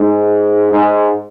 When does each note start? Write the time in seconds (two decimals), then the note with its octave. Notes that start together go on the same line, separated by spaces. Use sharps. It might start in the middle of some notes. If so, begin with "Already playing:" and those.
Already playing: G#2
0.72 G#2